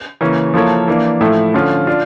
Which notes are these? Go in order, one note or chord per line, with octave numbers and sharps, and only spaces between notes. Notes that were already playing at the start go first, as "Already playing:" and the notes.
C#3 E3 A#3 C#4
F3 A#3 E4 A4 C#5
E3 A#3 D4
A2 F3 A3 E4
D3 F3 C#4 F4
D4 F4